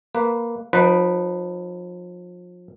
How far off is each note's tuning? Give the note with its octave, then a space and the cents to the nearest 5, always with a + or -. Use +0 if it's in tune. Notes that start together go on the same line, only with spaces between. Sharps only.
A#3 +0 B4 +0
F3 +35 D#4 -15 B4 +0